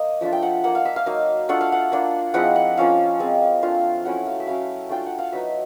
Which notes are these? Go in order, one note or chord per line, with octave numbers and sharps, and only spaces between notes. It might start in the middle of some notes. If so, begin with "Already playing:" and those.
Already playing: A#3 D#5
F3 A3 D4 F4 E5
G5
F#5
A#3 D#4 F#5
F5
E5
F5
F#3 A#3 D#4
A3 D4 F4 F#5
F5
F#5
A#3 D4 F4
F3 G#3 C4 E4 F#5
F#5
F3 A#3 C#4 F4 F5
G#3 C4 F4
A3 D4 F4
F#3 A3 C#4 E4 F#5
F5
E5
F#3 A3 C#4 E4 F5
A3 D4 F4 G5
F#5
F5
F#3 B3 D#4 E5